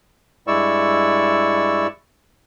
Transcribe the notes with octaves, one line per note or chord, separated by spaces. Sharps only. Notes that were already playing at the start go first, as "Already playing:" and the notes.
G2 G#3 E4 D5 C#6 E6